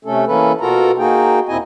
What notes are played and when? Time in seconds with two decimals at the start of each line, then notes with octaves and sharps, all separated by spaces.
0.05 C3 A3 C#4 A4
0.27 E3 A#3 C#4 A4 B4
0.61 B2 F4 F#4 A4 A#4 A#5
0.98 A#3 D#4 F#4 G#4 G5
1.49 D#2 A#2 C4 E4 D#5 G#5